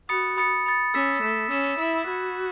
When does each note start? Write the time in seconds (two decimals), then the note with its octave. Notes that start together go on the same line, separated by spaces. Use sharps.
0.09 F#4 B5 D#6 A6 C#7
0.37 B5 D#6 A6 C#7
0.66 B5 D#6 A6 C#7
0.94 C#4 E6 B6 E7
1.22 A3 E6 B6 E7
1.51 C#4 E6 B6 E7
1.79 E4 E6 B6 E7
2.07 F#4 B5 E6 G#6
2.36 B5